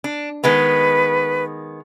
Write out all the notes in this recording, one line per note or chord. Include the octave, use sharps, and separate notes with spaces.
D4
D#3 G#3 B3 B4